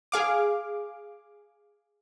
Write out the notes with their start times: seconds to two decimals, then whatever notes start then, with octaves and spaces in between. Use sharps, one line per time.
0.12 G#4 F5 D6